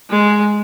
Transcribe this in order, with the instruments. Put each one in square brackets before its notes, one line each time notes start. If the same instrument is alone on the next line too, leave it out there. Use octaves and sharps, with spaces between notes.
[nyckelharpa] G#3